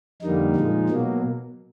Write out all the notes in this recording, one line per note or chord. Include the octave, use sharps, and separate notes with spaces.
F2 D3 G3 A#3 D#4
A#2 F3 G#3
B2 F#3 A#3